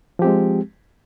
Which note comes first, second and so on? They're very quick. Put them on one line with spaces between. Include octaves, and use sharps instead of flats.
F3 G4 C4 G#3